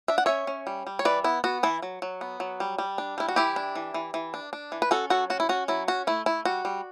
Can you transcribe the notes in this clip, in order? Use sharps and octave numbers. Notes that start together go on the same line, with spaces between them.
D4 E5
F#5
C#4 C#5 E5
C#4
G3
G3
C#5
E3 B4 D5
B3 E4
B3 F#4
E3 E4
F#3
F#3
B3
F#3
G3
G3
D4
G3 E4
F#4
E3 E4 G4
D4
E3
E3
E3
D4
D4
E3
B4
C#4 F#4 A4
F#3 F#4 A4
C#4 F#4
E4
C#4 F#4
F#3 E4
C#4 F#4
A3 E4
A3 E4
G3 F#4
G3